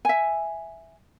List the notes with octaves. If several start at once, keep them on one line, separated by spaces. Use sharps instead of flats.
E5 G#5